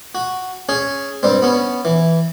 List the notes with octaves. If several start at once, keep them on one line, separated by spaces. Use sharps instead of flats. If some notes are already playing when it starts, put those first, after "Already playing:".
F#4
C#4 G#4
G2 G3 C4
B3 C#4
E3